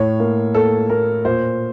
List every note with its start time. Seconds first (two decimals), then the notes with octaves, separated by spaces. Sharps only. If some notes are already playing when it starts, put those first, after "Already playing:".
Already playing: A2 C#5
0.20 A#3
0.54 A#3 A4
0.89 A#3 A#4
1.25 A#2 C5